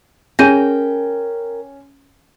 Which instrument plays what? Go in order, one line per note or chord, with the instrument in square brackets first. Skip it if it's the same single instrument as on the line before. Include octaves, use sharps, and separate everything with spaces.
[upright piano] C#4 G#5 [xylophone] G#4 G6 A#6 [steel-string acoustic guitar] A#4 G5